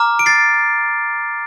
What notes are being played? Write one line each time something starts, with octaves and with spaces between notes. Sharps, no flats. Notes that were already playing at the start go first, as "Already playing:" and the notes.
Already playing: A#5 D6 F6
D7
A6 C7